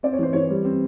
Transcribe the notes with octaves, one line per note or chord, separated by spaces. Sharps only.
C4 D5
C#5
E3 C5
E3 C#5
G3
C4